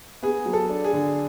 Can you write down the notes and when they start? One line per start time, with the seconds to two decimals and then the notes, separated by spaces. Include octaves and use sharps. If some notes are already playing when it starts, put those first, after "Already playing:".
0.23 B3 G#4
0.46 F#3
0.53 A4
0.69 D4
0.84 G#4
0.93 D3